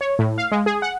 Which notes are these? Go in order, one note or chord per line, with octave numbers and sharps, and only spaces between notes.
C#5
A2
F5
G#3
G#4
F#5